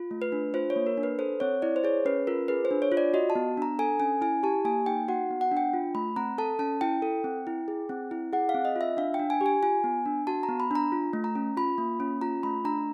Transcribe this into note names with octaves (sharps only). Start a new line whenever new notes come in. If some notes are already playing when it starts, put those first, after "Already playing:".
Already playing: F4
A3
B4
D4
F4 C5
C#5
A#3
A#4
D4
B4
A4 C5
C4 C#5
E4 D5
C5
G#4 C#5
C#4 B4
F4 A#4
G#4 B4
C5
D4
C#5
F4
D5
F#4 D#5
A5
B3
D4 A#5
A4 G#5
C#4 G#5
E4 G#5
G4 A5
A#3 G#5
D#4 G5
F#4 F#5
B3
F#5
D4
G5
F4
A3 B5
C4 A#5
A4 A5
C#4 A5
E4 G5
A4
C4
E4
G#4
C4
E4
G#4 F#5
F5
C4
D#5
F4
E5
D4 F5
G5
D4
G#5
G4
G#5
F4 G#5
B3
D4
F#4 A5
A#5
B3
B5
D4 A#5
F4
A3
A#5
C#4
F4 B5
A#3
C#4
F4 A#5
A3 B5
D4 A#5